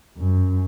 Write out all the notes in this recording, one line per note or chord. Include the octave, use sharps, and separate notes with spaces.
F#2